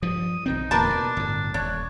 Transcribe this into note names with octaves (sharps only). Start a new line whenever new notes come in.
G2 F3 D#6
B1 D#3 C4 D#4
D1 E2 A#3 D4 A#4 B4 A5
B2
G1 A2
D#1 D4 C#5